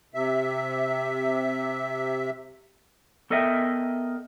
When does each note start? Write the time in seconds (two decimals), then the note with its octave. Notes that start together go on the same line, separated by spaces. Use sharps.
0.14 C3 E5
3.30 B3 A4 A#4 D#5 E5 G5